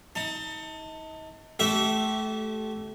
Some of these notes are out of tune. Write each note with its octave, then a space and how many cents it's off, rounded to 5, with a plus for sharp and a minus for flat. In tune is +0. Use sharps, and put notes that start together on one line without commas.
D#4 +35 A5 +30
A3 -20 G4 -35 E5 +0